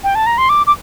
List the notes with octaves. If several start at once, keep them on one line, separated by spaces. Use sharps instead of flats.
G5
A5
A#5
C6
D6
D6